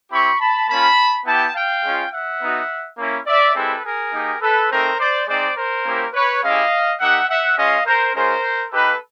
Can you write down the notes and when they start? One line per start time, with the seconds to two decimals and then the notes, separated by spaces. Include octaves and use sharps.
0.11 C4 E4 G4 B5 C#6
0.40 A5 B5
0.68 A#3 C#4 F4 A5 B5
1.26 B3 E4 G4 G5 A5
1.55 F5 G5
1.83 G#3 C#4 F4
2.12 E5 F#5
2.41 B3 D#4 F#4
2.98 A#3 C#4 E4
3.27 D5 E5
3.55 G#3 C4 E4 G4 A4 B4
3.84 G#4 A#4
4.13 A#3 D#4 G4
4.41 A4 B4
4.70 A3 C4 D#4 A#4 C5
4.99 C5 D5
5.27 G#3 C4 D#4 C5 D5
5.57 A#4 C5
5.85 A#3 C#4 E4 G4
6.13 B4 C#5
6.43 G#3 C#4 E4 G4 D#5 F5
7.00 A#3 D#4 G4 E5 F#5
7.29 E5 F#5
7.57 G#3 C#4 F4 D#5 F5
7.86 A#4 C5
8.14 G#3 C#4 F4 A#4 C5
8.72 A#3 D#4 G4 A4 B4